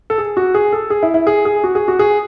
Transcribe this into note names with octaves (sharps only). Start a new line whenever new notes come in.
A4
G#4
F#4
G#4
A4
G#4
E4
E4
G#4
G#4
F#4
G#4
F#4
G#4